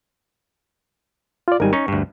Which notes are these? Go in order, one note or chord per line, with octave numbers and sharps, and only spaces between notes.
F4 D5
G#1 G3 D#4 A#4 G#5
C#4 D#4 C#6
D2 G2